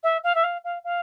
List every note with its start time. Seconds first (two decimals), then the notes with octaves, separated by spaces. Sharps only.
0.03 E5
0.24 F5
0.35 E5
0.44 F5
0.64 F5
0.84 F5